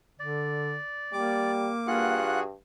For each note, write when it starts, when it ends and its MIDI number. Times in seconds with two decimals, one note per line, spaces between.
0.19 0.78 50
0.19 1.52 74
1.13 1.71 55
1.13 2.23 58
1.13 1.87 86
1.87 2.52 43
1.87 2.40 65
1.87 2.43 66
1.87 2.43 68
1.87 2.40 78
1.87 2.40 90